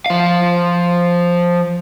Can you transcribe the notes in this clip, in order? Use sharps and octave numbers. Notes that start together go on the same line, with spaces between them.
F3 F5